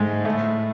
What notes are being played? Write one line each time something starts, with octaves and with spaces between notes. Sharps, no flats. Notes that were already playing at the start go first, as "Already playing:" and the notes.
Already playing: G#2 G#3 A3
A2 A3